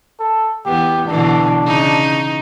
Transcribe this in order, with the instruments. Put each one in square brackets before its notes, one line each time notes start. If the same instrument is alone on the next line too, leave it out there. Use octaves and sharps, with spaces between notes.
[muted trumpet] A4
[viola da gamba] E2 B3 [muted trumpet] G4
[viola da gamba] B2 D3 E3 [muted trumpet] D4
[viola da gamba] C#3 D#4